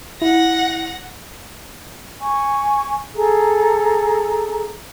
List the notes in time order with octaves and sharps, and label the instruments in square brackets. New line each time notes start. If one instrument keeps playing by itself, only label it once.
[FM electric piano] E4 [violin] F#5 A#6
[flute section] G#5 C#6
G#4 A4 A#5